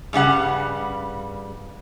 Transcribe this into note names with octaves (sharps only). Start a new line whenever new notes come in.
G2 C#3 G3 F#5